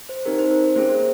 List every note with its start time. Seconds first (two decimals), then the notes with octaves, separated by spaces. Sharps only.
0.09 C5
0.26 C4 D#4 G4 A#4
0.38 C5
0.51 A#4
0.64 C5
0.76 A#3 C#4 G#4 C5